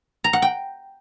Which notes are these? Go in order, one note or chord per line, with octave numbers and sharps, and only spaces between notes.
A#5
F#5
G5